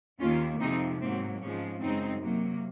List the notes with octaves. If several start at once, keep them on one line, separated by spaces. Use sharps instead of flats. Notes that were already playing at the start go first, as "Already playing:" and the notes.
D#2 D#3 A#3 C#4 F4
F2 C3 F3 G#3 C4 D#4
G#2 F#3 A#3 C4
G#2 F3 G#3 C#4
F#2 C#3 G#3 C4 D#4
C3 F#3 A#3